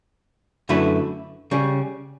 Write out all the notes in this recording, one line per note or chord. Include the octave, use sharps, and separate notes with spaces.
F#2 D3 A3 E4 B4
C#3 G3 C#4